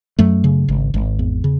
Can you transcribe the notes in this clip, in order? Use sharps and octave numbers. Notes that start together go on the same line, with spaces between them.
F#2 F#3 A3
C#3
G#1
G#1
E2
C#3